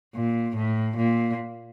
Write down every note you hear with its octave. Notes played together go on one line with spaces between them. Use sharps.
A#2
A2
A#2